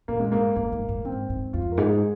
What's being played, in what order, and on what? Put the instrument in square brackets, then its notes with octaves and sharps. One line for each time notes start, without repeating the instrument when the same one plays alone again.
[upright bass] A#2 [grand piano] A#3
[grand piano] G#3
[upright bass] G#2 [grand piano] A#3
[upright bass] G#2 [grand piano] A#3
[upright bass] G#2
G#2
[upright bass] G#2 [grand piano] C4
[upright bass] G#2
[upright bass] F2 [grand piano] F4
[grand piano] A#4
[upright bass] G#2 [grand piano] G#4